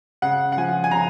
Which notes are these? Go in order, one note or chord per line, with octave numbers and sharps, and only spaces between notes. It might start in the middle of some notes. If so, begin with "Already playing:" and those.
C#3 F#5
F#5
F3 G#5
G#5
C#3 A#5